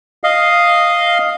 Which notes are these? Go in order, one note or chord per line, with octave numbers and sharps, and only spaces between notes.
D#5 F5